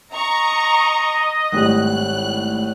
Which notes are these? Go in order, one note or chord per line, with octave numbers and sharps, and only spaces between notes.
D#5 A#5 C#6
G#1 A2 G3 F#6